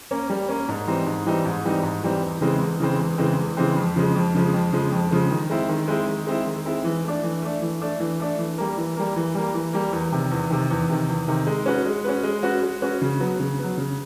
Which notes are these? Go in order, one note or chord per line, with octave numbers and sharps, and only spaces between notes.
A#3 C#4
G3
A#3 C#4
G#2
E3 G3 C4 D#4
G#2
E3 G3 C4 D#4
G#2
E3 G3 C4 D#4
G#2
E3 G3 C4 D#4
E2
C#3 E3 G#3 C4
E2
C#3 E3 G#3 C4
E2
C#3 E3 G#3 C4
E2
C#3 E3 G#3 C4
F2
C#3 F3 G#3
F2
C#3 F3 G#3
F2
C#3 F3 G#3
F2
C#3 F3 G#3
D#3
G#3 C4 E4
D#3
G#3 C4 E4
D#3
G#3 C4 E4
D#3
G#3 C4 E4
E3
A3 D4
E3
A3 D4
E3
A3 D4
E3
A3 D4
E3
G3 A#3
E3
G3 A#3
E3
G3 A#3
E3
G3 A#3
E2
C3 D#3
E2
C3 D#3
E2
C3 D#3
E2
C3 D#3
G#3
C#4 F#4 B4
G#3
C#4 F#4 B4
G#3
C#4 F#4 B4
G#3
C#4 F#4 B4
C#3
F#3 B3
C#3
F#3 B3
C#3